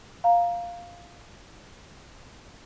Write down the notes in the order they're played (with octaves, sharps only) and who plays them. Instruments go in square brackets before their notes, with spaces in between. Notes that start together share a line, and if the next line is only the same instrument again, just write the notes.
[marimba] F5 A#5